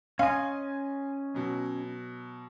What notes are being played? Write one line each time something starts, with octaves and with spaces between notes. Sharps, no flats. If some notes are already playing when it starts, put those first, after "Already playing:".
C#4 D#5 F5 G#5 C6
B2 F#3